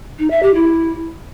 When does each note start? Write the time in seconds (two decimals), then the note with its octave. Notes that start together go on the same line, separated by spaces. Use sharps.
0.19 D#4
0.30 E5
0.42 G4
0.54 E4